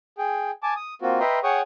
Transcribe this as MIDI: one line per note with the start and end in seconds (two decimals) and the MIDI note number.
0.18 0.51 68
0.18 0.51 79
0.63 0.74 80
0.63 0.74 81
0.63 0.74 86
0.76 0.94 87
1.02 1.20 58
1.02 1.20 60
1.02 1.20 65
1.02 1.20 66
1.20 1.39 71
1.20 1.39 75
1.20 1.39 76
1.20 1.39 79
1.20 1.39 82
1.20 1.39 84
1.44 1.61 68
1.44 1.61 73
1.44 1.61 78
1.44 1.61 79
1.44 1.61 85
1.44 1.61 87